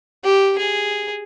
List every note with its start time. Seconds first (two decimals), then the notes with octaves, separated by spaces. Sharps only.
0.24 G4
0.58 G#4